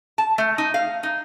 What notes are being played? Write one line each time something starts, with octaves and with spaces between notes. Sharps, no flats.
A5
A3
D#4
F5
D#4